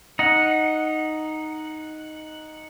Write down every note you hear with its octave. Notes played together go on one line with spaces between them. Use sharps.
D#4 F#5